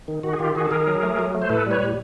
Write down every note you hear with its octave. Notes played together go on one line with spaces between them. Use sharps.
D#3
D#3 F#4
G#4
D#3 F4 G4
D#3 F#4 G#4
A4
D#3 G#4 A#4
F#3
A3
F#3
A3
C5
A2 A4 B4
G3 B4 C#5
A2